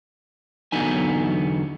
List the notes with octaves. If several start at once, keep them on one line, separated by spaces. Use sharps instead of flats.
E2 D3 F#3 B3 D#4 G#5